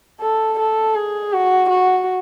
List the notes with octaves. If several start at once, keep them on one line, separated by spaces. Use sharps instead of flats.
A4
A4
G#4
F#4
F#4